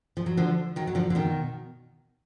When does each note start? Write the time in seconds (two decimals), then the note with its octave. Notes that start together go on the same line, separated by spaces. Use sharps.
0.17 F3
0.26 F#3
0.37 D3 F3
0.76 D#3 F#3
0.87 F#3
0.95 D3 F3
1.10 D3
1.15 B2 D#3